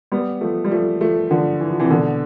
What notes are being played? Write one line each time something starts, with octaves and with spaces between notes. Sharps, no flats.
G3 B3
F3 A3
G3
F3 A3
F3 A3
D3 F3
E3
F3
C3 E3
B2 D3